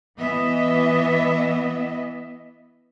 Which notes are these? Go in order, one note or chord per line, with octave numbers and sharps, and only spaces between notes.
E3 B3 D#5 E5